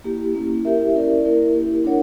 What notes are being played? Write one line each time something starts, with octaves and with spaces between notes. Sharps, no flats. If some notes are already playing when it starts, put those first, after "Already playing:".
A#3 E4 G4
A#3 C#4 E4
E4 G4 A#4 E5
C#4 E4 A#4 D5
A#3 E4 A#4
A#3 E4 G4
D4 A#4 C#5 F#5